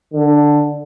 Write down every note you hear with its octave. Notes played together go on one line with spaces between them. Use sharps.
D3